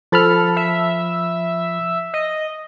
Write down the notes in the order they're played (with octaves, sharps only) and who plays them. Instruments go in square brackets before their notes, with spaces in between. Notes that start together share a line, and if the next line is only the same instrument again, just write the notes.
[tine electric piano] F3 B5 F6 [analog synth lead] A4
[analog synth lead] E5
D#5